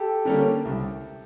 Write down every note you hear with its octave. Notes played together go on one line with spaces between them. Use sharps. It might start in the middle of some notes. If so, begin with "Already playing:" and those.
Already playing: G4 A4
D3 G3 A#3 C#4
C2